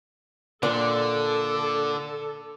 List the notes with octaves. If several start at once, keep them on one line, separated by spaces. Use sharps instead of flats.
A#2 D3 D4 A4